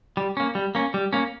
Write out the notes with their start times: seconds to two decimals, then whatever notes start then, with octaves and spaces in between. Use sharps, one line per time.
0.17 G3
0.37 A#3 C#4
0.55 G3
0.75 A#3 C#4
0.94 G3
1.13 A#3 C#4